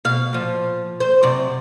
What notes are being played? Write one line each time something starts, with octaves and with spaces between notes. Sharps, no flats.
B2 F5
A#2 F3
C5
F#2 C3 D5